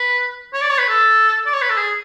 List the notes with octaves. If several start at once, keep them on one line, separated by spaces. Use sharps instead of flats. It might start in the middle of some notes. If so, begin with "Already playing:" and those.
Already playing: B4
C#5
D5
C#5
B4
A4
D5
C#5
B4
A4
G#4